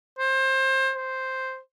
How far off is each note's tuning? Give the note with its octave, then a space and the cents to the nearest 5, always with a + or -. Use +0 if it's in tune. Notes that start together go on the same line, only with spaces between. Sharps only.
C5 +25
C5 +0